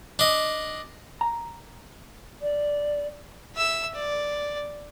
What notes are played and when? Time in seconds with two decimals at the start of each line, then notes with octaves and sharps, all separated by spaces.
0.19 D4 D#5
1.21 A#5
2.42 D5
3.56 E5 E6
3.95 D5